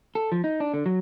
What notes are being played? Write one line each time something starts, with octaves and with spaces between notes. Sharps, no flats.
A4
F3
D#4
D4
D3
F#3